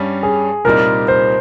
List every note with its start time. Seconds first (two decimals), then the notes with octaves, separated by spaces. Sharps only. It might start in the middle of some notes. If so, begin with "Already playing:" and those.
Already playing: G2 G3 C#4
0.23 G#4
0.65 C2 A#2 G3 C4 D#4 A#4
1.08 C5